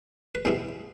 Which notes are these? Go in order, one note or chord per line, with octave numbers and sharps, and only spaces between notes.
B4
E2 B2 G3 B3 E4 C5